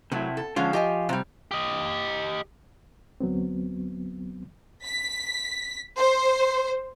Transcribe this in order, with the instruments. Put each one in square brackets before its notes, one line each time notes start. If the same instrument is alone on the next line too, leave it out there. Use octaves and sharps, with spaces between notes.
[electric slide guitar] C3 E4 [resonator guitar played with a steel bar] F#3 A3
[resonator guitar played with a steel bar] A4
[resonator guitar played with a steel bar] D3 G#3 C#4 [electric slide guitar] F3 F4
[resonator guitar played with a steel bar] G4 D#5 G#5
C3 G3
[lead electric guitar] G4 D#5
[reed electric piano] D2 F#3 B3 C4
[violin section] B6
C5